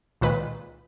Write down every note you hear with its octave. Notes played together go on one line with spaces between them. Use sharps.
C#2 A#2 D#3 B4